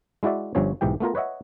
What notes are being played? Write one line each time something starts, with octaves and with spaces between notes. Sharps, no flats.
G#3 E4 F#4 D5 E5
G1 G2 F3 C#4 C#5
B1 G#2 E3 G4 G5
A3 B3 F4 A#4
B4 C#5 D#5 E5 F#5